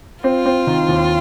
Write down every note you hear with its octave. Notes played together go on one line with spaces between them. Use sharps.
C4 F4
C4
D#3
D#2